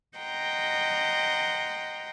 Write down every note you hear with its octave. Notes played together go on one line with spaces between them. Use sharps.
D#5 F#5 G5 A#5 C6